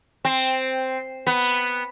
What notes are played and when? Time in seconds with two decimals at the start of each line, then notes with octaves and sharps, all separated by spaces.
0.25 C4
1.27 B3